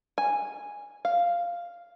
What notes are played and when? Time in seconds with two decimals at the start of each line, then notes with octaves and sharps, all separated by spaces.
0.18 G#5
1.05 F5